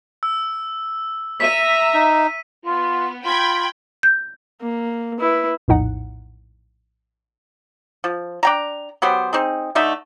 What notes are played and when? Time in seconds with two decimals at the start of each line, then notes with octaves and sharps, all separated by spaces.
0.23 E6
1.40 E5 A#5 B6 D#7
1.94 D#4
2.66 B3 F4
3.25 F4 G5 B5 G#6
4.03 G6
4.61 A#3
5.19 E4 B4
5.68 A#1 E2 A2 D#4 F#5
8.04 F3
8.43 D4 G5 A#5
9.02 F#3 B3 G4 C5
9.33 C4 D#4 G#4
9.75 D3 A3 D#4 E5